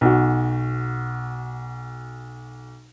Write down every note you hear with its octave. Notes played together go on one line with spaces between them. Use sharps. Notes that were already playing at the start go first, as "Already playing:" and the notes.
B1 F#4